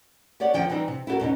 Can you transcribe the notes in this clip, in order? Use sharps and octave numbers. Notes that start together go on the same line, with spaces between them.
G4 C#5 D5 F#5
E2 D3 F3 C5 G5
E3 G3 C4 D#4
C3
E4 F#4 A4 A#4
E2 B2 C#4 D#4